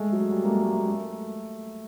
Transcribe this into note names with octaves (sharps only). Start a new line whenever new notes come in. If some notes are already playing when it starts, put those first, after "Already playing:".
Already playing: G#3 A3
F#3
G3
A#3
A3
A3
A#3
A3